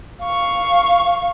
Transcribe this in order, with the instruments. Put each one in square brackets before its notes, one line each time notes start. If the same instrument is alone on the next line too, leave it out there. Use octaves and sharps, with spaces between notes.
[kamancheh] F5 C#6